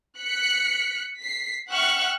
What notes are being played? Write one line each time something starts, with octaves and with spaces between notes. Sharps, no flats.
F#6 B6 C#7
B6 C7
E5 F#5 G5 C#6 F6 F#6